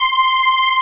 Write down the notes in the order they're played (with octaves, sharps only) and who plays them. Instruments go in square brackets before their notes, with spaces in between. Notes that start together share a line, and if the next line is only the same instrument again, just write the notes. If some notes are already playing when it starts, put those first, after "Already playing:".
Already playing: [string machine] C6